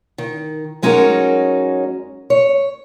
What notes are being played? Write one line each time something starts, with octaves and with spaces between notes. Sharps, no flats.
D#3
F#2 G#3 C#4 D#4 F#4 A#4
C#5